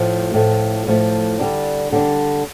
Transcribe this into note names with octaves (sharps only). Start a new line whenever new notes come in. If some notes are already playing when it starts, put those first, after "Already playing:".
Already playing: A2 F3 A3
A2 F3 A3
A2 F3 A3
D3 G3 D4
D3 G3 D4